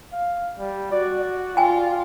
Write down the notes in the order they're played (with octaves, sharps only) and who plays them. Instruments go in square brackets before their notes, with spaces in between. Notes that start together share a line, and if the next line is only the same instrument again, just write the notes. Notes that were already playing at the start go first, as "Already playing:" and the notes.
[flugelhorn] F5
G3
[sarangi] F#4 [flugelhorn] D5
[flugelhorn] D5
[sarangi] F4 [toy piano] G5 G#5